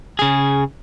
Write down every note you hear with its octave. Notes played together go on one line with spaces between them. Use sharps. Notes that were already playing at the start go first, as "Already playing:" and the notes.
C#3 G#4